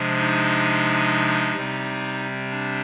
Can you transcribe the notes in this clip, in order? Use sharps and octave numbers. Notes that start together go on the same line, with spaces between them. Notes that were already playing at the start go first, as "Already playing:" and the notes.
Already playing: C3 F3 G#3 D4
D#4
C3 G3 C4
D4